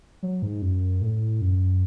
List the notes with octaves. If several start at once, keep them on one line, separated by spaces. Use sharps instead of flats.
F#3
G#2
F#2
A2
F#2